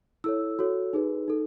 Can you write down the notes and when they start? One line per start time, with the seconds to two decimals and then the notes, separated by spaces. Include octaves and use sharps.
0.24 E4 A4 C#5 E6
0.59 F#4 A4 C#5
0.93 D#4 G#4 B4
1.28 D#4 A4